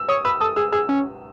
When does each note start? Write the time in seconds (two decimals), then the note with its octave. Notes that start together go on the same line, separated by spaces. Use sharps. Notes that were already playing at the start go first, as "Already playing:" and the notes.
Already playing: E6
0.08 C#5 D#6
0.25 B4 E6
0.41 A4 D#6
0.56 G#4 E6
0.72 G#4 E6
0.89 C#4